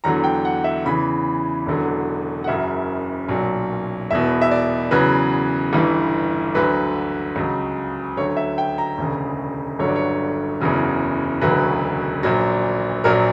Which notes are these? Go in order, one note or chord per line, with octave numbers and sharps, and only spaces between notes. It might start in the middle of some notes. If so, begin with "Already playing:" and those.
E2 D3 F#3 A#5
G5
F#5
E5
E2 C#3 E3 B5
E1 E2 D3 F#3
F#5
F#1 F#2 C#3 F#3 E5
B1 A#2 F#3
E1 E2 B2 E5
E5
D5
E2 C#3 F#3 B4
G1 G2 E3
D2 D3 F#3 B4
C#2 C#3 F#3
D2 D3 F#3 C#5
E5
G5
A#5
E1 D2 C#3
G1 G2 D3 F#3 C#5
D5
C#5
F#1 E2 C#3 F#3
E1 D2 C#3 F#3 B4
A#1 A#2 F#3
A#1 A#2 F#3 A#4